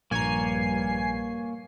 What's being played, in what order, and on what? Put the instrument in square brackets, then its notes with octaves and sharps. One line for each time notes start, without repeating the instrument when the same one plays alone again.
[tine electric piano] A#1 G#6 [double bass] G2 [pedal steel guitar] A#3 C#5 A#5 [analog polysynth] G#5 C7